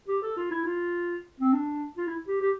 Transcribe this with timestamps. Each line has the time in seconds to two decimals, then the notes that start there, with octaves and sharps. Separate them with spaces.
0.08 G4
0.22 A4
0.37 F4
0.51 E4
0.66 F4
1.40 C4
1.53 D4
1.98 F4
2.07 E4
2.28 G4
2.42 G4